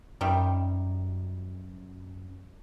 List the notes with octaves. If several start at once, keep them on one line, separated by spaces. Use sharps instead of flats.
F#2 C3 D#3 G3